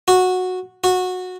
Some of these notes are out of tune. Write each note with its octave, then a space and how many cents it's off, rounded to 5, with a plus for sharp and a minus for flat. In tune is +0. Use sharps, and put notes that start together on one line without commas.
F#4 -10
F#4 -15